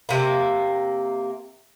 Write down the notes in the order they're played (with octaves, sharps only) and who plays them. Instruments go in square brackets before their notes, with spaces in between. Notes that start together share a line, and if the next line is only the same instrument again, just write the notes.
[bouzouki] C3 A#3